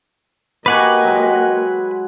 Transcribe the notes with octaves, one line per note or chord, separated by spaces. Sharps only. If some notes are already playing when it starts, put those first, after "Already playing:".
A#3 F#4 G4 B4 D#5 F#5 G#5
F#3 G#3